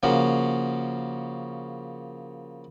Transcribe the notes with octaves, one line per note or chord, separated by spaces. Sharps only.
C#3 F3 A#3 C#4 F#4